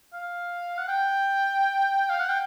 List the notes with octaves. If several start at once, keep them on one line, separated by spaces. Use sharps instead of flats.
F5
F#5
G5
F5
F#5
G5